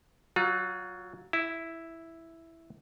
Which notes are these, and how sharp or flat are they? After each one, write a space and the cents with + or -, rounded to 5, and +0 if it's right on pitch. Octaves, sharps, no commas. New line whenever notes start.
F#3 +15 F4 +40
E4 +0 E5 -35